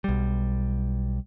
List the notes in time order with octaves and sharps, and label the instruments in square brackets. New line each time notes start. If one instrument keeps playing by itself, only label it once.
[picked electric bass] B1 G3